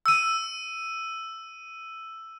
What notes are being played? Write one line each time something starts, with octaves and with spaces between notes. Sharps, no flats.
E6 D#7